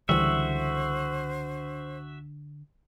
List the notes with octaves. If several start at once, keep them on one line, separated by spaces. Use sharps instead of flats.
C#2 D3 E3 G3 F#4 C5 E5